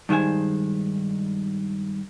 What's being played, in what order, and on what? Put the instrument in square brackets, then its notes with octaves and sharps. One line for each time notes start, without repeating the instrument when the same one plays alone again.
[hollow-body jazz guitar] G2 D#3 G#3 C5 G#5